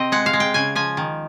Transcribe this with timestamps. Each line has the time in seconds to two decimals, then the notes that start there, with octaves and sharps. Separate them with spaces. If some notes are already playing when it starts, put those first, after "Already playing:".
Already playing: C3 C4 D#5
0.12 G#3 F#5
0.26 F5
0.33 G#3
0.40 G5
0.54 C#3 G#5
0.75 F3 G#5
0.97 D#3